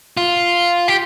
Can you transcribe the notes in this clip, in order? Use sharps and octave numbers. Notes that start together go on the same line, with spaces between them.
F4
G4